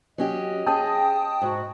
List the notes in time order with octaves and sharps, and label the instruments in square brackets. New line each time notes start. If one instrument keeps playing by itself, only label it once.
[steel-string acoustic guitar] F#3 C#4 G4 [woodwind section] D#5
[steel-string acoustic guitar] C#4 G#4 [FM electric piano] G5 A5 D#6
[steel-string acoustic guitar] G#2 [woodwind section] F#4